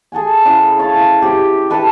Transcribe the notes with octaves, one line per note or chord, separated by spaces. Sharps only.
G#4 A4 F#5 G#5
C#3 E4
C#5 F5 A5
E4
C3 G4
G4 A4 B4 E5